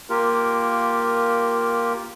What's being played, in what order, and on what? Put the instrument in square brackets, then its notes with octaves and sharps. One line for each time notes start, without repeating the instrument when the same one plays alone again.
[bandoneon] A#3 F4 G4 A#4